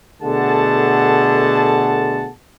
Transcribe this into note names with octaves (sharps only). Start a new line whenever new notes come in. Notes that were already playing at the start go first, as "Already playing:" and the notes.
B2 D3 A3 G#4 F#5 A5